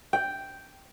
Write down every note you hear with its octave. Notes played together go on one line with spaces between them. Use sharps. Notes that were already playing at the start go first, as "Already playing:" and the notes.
G5